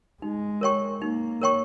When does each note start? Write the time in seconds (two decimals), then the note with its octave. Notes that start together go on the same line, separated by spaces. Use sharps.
0.22 G#3 D#4
0.61 A#4 C#5 G5 C#6
1.01 A#3 D#4
1.41 A#4 C#5 G5 C#6